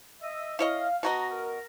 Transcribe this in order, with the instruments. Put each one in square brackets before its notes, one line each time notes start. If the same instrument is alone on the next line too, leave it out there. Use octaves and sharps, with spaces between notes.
[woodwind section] D#5 E5
[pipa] E4 C#5 D#5 [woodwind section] F5
[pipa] B2 F#4 D#5 [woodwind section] A#5
[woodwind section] A#4